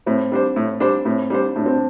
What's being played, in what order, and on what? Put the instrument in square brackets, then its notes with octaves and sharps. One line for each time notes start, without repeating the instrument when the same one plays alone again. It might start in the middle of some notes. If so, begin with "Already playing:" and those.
[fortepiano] A2 [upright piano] C4
[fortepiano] G3 D4 C5
A2
G3 D4 C5
[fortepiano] A2 [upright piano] C4
[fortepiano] G3 D4 C5
[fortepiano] A2 [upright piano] D4
[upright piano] C4
D4